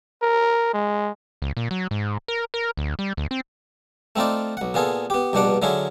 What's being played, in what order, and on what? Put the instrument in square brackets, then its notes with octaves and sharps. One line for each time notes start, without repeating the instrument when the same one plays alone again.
[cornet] A#4
G#3
[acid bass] C#2
A#2
F#3
G#2
A#4
A#4
D2
G3
D2
C4
[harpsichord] A3 C4 D#4 F4 D5
B1 F#5
A#2 B3 F4 G#4 A4
B3 G4
A#1 G2 B2 D4 F#5 D6
D3 F#3 E4 F4 G#4